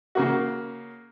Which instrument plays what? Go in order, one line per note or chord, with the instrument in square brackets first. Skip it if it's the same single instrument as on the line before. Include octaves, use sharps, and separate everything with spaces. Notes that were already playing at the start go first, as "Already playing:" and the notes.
[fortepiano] C#3 A#3 F#4